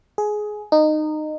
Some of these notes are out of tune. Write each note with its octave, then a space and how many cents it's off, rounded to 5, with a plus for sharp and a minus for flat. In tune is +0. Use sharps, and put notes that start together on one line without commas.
G#4 +15
D#4 -20